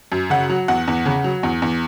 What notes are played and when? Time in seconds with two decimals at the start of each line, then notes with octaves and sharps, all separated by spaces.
0.12 F#2
0.30 C#3 F#5
0.50 F#3
0.68 E2 F#5
0.88 E2
1.06 C#3
1.24 F#3
1.43 E2
1.62 E2